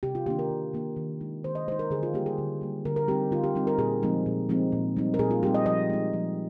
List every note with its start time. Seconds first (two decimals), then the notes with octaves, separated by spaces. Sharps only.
0.03 C3 G4
0.15 F4
0.26 D#3 A#3 D4 G4
0.39 A#4
0.51 C3
0.74 D#3 A#3 D4
0.96 D#3
1.21 G#3 D#4
1.44 D#3 C5
1.55 D#5
1.68 G#3 D#4 C5
1.79 A#4
1.91 D3 G#4
2.03 F4
2.14 G3 A#3 G4
2.26 G#4
2.38 D3
2.61 G3 A#3
2.85 D3 A#4
2.96 A#4
3.08 G3 C4 D#4 G4
3.31 D3 F4
3.44 G4
3.55 G3 C4 D#4
3.67 A#4
3.78 A#2 G#4
4.03 F3 G#3 C4 D#4
4.26 A#2
4.49 F3 G#3 C4 D#4
4.72 A#2
4.97 G3 C4 D#4
5.14 A#4
5.19 A#2 G#4
5.31 F4
5.43 G3 C4 D#4 G4
5.54 D#5
5.66 F3 D#5
5.90 G#3 D#4
6.13 F3